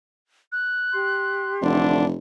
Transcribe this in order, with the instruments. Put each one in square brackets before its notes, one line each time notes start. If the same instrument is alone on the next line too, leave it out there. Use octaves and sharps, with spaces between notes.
[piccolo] F#6
[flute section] G4 C6
[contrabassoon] F1 [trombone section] D3 E3 D4